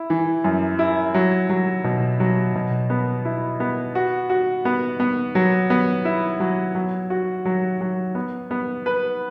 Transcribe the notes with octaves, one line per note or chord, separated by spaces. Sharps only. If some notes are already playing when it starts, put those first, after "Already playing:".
Already playing: E4
E3
F#2
E4
F#3
F#3
B2
F#3
B2
B3
E4
B3
F#4
F#4
B3
B3
F#3
B3
E4
F#3
F#3
F#4
F#3
F#3
B3
B3
B4